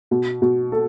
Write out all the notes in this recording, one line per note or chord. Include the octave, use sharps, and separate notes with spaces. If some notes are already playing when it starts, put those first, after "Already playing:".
B2
B2
A4